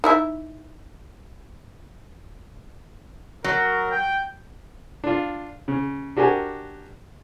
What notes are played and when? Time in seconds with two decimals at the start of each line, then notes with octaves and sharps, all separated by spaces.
0.04 D#4 E4 E5
3.44 F#3 A#4
3.91 G5
5.04 D4 F4
5.68 C#3
6.17 D4 F#4 G4 A#4 G#5